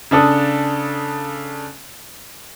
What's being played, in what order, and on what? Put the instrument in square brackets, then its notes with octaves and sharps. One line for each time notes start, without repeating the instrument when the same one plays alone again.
[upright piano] C#3 D4 A4 D#6